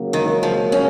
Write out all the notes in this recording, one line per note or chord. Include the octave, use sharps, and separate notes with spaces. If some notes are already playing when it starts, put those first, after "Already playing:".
Already playing: C#2 C#3 F#3 A#3
D#3
F3
C#4